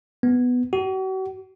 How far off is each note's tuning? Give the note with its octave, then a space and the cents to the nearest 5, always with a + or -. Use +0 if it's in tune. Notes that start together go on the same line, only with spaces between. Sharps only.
B3 +5
F#4 +40